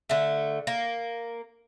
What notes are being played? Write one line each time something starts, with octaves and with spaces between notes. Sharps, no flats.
D3 A3
A#3